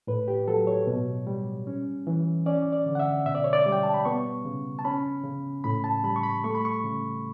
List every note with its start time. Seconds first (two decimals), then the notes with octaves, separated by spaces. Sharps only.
0.07 A2 B4
0.28 G4
0.48 F#3 A4
0.67 C#5
0.87 B2
1.27 G3
1.67 C#4
2.07 E3
2.46 C#4 D5
2.72 D5
2.86 D3
2.95 F#5
3.00 E5
3.26 B2 E5
3.35 D5
3.44 C#5
3.53 D5
3.66 G3
3.72 G5
3.83 A5
3.94 B5
4.05 B3 C#6
4.45 C#3
4.79 A5
4.85 C#4 B5
5.24 C#3
5.64 A2 B5
5.84 A5
6.04 G3 B5
6.16 C#6
6.23 B5
6.44 A3 C#6
6.55 B5
6.65 C#6
6.84 C#3